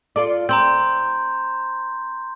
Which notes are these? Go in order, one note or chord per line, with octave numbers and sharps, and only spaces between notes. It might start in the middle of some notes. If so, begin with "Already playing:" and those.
F4 A4 D5
C4 A#5 C6 G6